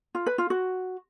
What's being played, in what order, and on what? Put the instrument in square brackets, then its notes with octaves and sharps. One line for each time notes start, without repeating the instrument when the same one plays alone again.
[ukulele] F4
B4
F4
F#4